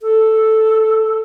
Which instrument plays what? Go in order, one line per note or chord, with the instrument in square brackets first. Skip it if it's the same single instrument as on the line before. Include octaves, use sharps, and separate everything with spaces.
[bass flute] A4